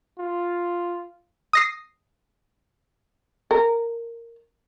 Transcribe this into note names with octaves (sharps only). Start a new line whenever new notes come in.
F4
D#6 A#6 C7
A#4